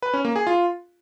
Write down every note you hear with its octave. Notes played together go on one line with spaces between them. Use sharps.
B4
C#4
A#3
G#4
F4